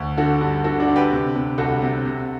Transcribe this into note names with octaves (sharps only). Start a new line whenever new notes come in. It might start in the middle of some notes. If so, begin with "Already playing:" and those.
Already playing: D2
D3 F#4 A4
G2
D3 F#4 A4
D4 F#4
D3
G4 B4
C3
C3
C2 F#4 A4
C3
C3